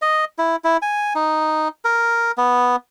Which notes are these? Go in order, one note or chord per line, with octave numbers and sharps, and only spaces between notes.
D#5
E4
E4
G#5
D#4
A#4
B3